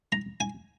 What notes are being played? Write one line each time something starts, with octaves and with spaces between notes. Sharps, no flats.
A#5
G#5